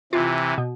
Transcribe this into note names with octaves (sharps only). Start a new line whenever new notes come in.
C3 E3 F4
B2